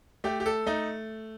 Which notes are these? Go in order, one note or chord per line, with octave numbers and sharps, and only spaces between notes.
A3 G4
G4
A4
A3 D#4